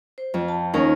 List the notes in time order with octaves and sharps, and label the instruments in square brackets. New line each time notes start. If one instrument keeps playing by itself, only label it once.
[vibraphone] C5
[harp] F2
[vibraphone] A5
[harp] D#2 C#4 A#4 [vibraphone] D#4